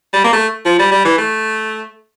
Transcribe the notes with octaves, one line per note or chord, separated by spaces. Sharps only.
G3
A#3
A3
F3
G3
G3
E3
A3